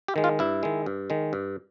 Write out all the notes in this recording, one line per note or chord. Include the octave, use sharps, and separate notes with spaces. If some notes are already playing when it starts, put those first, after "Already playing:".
G4
D#3 G#3
F4
G2 E4
D#3 G#3
G2
D#3 G#3
G2